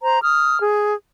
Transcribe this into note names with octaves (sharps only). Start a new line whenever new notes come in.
C5 A#5
D#6 F6
G#4